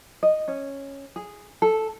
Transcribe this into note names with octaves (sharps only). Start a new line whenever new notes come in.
D#5
C#4
G#4
A4